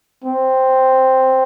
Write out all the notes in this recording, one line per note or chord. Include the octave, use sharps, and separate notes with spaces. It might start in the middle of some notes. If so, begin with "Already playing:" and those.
C4